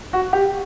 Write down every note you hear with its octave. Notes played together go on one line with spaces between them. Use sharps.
F#4
G4